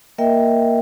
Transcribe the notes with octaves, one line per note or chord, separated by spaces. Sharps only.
A#3 A#4 D#5 E5 G5